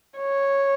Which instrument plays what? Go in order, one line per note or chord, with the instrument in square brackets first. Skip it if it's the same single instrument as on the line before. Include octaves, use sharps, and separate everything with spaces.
[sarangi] C#5